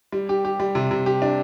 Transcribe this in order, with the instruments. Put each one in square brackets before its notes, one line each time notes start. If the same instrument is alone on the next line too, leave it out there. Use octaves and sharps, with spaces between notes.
[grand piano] G3
G4
G4
G3
C3
C3
G4
D4